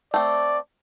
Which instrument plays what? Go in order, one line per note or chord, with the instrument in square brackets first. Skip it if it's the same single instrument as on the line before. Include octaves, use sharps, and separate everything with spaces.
[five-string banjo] A3 C4 [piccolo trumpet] D5